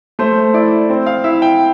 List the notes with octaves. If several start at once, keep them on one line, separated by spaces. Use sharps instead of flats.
A3 C5
E4 D5
C4
F5
E4 E5
G5